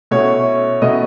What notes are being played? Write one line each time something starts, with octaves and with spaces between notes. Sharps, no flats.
B2 A3 C#4 E4 C#5
B2 A3 C#4 E4 D#5